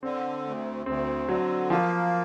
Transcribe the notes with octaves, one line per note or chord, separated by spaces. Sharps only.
D3 C4
D2
D2 C4
D3 F#3
F3 A#3